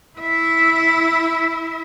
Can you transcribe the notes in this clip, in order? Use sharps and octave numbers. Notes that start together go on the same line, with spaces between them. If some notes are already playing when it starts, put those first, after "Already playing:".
E4 E5